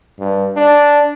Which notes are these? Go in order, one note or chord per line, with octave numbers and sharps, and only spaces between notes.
G2
D4